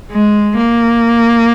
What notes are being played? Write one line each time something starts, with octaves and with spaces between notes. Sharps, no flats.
G#3
A#3